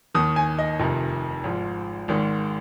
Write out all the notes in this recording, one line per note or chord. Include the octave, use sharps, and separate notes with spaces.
D#2 D#3 D#6
G#5
D#5
F1 F2 C3 D#3
G#1 G#2 F3
G#1 G#2 D#3